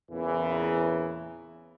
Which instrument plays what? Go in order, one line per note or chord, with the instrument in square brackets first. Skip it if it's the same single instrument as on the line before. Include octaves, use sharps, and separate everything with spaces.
[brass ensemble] E2 A#2 C#3 E3